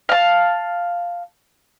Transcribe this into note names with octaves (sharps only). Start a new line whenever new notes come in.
F5 A5